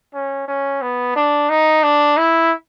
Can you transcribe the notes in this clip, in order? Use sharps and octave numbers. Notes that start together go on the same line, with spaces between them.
C#4
C#4
B3
D4
D#4
D4
E4